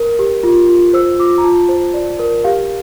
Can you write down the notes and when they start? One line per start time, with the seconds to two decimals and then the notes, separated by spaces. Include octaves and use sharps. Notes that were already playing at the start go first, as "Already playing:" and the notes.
Already playing: A#4
0.19 G4
0.43 F4
0.69 F4
0.93 C5 E6
1.19 F4 D6
1.38 A#5
1.44 F4 A5
1.69 C5
1.94 D5
2.19 A#4
2.44 G4 F5